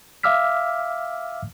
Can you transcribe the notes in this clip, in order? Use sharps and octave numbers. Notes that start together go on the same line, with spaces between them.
E5 F5 D6 E6 F6 B6